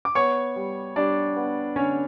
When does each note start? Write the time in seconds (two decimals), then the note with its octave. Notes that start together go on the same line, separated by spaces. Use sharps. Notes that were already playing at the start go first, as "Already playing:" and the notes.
0.05 D6
0.15 B3 C#5 C#6
0.56 G3
0.96 G3 D4 D5
1.36 B3
1.76 D3 C#4 C#5